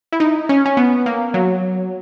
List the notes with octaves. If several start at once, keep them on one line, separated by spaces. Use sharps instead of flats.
E4
D#4
C#4
C#4
B3
A#3
F#3